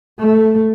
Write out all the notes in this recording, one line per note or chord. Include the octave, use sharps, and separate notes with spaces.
A3